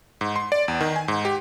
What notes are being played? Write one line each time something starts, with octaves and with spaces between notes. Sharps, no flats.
G#2
C6
D5
E2
D#3
G#5
G#2
G4